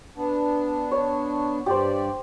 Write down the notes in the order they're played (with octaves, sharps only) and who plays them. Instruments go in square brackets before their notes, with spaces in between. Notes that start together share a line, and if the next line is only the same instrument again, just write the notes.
[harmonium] B3 D4
[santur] C#5
[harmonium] G2 D5 [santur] G4 C5